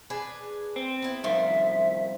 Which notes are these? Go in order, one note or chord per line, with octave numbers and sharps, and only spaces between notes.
D4 G#4 B4
C4
B3 E4
C2 F#2 D#3 F3 C5 E5